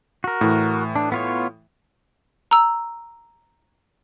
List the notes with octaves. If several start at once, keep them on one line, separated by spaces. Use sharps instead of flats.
F#4 A#4
A2 E3
D4
B3 F4 C#5
A#5 E6